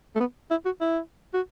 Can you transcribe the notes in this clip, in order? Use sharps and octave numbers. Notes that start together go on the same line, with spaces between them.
A3
B3
E4
F#4
E4
F#4